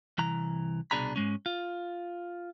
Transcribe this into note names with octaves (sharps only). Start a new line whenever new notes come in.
C2 E3 A#5
C2 B2 D4 G#4 A#5 B5
G#2 G#3 C#4
F4